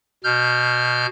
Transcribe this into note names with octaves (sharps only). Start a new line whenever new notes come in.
B2 F6 G6